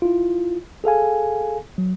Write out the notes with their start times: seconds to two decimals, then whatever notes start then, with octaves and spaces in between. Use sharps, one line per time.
0.02 E4 F4
0.84 G#4 A4 F5 G#5
1.78 F#3